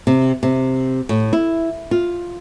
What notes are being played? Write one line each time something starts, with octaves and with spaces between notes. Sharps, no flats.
C3
C3
A2
E4
F4